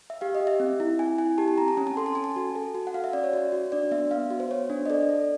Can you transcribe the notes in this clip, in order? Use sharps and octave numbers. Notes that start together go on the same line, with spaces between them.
E5
G4 F5
D#5
G4
E5
C4
E4
C4 G#5
E4 G#5
G4 A5
A5
C4 A#5
A5
C#4 G#5
A5
A4 C6
A5
C#4 G#5
A5
F#4
A4
F#4
F#5
F#4 F5
E5
C#4 D5
C#5
F#4
F#4
D4 D5
B3 E5
B3 F5
F#4
C5
B3 C#5
D4 C5
D#5
A4 D5
A4